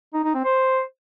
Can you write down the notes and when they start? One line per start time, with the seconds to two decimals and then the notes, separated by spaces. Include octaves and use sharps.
0.14 D#4
0.24 D#4
0.34 C4
0.45 C5